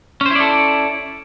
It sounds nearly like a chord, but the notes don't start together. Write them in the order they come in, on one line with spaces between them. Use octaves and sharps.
C#4 C5 E4 D5 A4